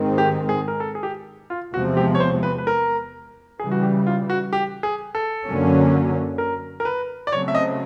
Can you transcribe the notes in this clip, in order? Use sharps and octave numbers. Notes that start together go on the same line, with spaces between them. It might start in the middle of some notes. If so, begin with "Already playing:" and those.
Already playing: G#2 D#3 G#3 C4
G4
G#4
A#4
A4
G#4
G4
F4
E2 C3 F3 G#3 C4 F#4
G4
C#5
C5
B4
B4
A#4
C#3 E3 G3 G#4
F#4
G4
F4
F#4
G4
G#4
A4
F#2 D3 F#3 A#3 C#4
A#4
A#4
B4
D5
C#3 F#3 A3 C4 C#5
E5
D#5